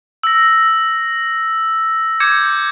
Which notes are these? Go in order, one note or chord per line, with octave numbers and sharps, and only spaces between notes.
E6 A#6
D6 G6 G#6 C#7